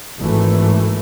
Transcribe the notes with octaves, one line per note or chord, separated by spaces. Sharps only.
G#1 E3 A3